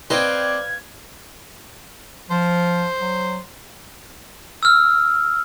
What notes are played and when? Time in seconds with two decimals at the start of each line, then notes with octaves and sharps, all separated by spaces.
0.10 C4 B4 D5 D#5 F5 G5 G#6
2.30 F3 C5
3.01 F#3
4.63 E6 F6